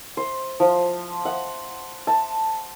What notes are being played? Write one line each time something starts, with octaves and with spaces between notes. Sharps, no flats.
C5
F3
F#5
A5